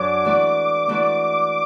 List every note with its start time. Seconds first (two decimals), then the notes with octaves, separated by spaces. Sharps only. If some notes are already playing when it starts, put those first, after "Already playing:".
Already playing: F#2 F#3 D4 A4 D5 D6
0.25 E3 A3 F#4 D5
0.89 E3 A3 F#4 D5